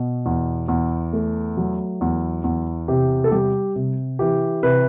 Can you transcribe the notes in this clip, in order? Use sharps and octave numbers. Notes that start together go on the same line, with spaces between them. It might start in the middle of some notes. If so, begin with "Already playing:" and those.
Already playing: B2
E2
E2
A3
F#3
E2
E2
C3 G4
A4
G3 G4
C3
E3 G4
C3 B4